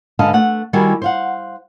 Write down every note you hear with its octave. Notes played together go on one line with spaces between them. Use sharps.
G#2 D3 B4 D#5 F5 A5
A3 F#5
D#3 G3 E4 F#4 G#4 A#4
C5 F5 F#5